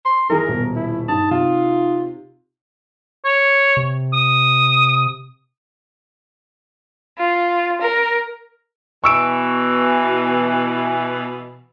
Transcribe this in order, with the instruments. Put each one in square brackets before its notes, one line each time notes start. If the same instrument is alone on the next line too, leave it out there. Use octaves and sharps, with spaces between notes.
[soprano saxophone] C6
[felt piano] D#3 E3 G#4 [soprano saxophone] A#4
[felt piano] D#1 B2
[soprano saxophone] E4
[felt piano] G2 [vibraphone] D#4 [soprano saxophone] A5
[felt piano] C3 [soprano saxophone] F4
[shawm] C#5
[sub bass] C3
[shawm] D#6
[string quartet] F4
A#4
[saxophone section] B2 E3 [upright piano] C#6 E6 D7